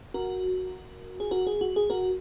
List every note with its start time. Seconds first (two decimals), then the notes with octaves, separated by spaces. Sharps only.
0.14 F#4 A#4
1.20 G#4
1.31 F#4 A#4
1.47 G#4
1.61 F#4
1.76 G#4
1.90 F#4 A#4